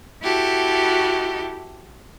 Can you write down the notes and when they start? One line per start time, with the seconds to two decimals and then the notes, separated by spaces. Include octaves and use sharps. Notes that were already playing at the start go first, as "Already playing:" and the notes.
0.21 E4 F#4 G4 A4